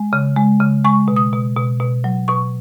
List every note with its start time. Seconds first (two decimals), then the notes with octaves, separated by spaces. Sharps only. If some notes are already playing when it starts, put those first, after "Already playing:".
Already playing: G#3
0.13 C#3
0.36 G#3
0.60 C#3
0.85 G#3 C#6
1.08 B2
1.16 D#6
1.33 B2
1.56 B2
1.80 B2
2.04 F#3
2.28 B2 C#6